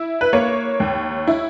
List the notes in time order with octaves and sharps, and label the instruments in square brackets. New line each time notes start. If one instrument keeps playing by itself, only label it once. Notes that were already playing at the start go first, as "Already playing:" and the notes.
Already playing: [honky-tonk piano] E4
B4
A#3 C#5
D#2
E4